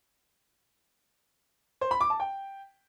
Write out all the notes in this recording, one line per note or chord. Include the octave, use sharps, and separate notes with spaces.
C5
B5
D6
A5
G5